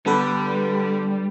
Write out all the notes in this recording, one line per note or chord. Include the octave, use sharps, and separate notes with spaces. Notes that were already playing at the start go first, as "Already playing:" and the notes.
D3 G3 B3 A4 B4